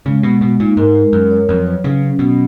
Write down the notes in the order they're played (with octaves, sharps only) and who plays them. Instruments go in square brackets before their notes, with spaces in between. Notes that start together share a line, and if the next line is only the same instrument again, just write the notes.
[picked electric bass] C#3 [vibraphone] G#3
[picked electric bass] B2 [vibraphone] G#3
[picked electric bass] B2 [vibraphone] G#3
[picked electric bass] A#2 [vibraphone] D#4
[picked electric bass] G#2 [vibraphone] A#4
[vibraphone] G#3
[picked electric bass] F#2 [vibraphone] A#4
[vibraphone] C#5
[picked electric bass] F2 [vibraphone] F#3
[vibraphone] B4
[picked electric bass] C#3 [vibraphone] F#3
[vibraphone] C#4
[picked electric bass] B2 [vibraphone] F#3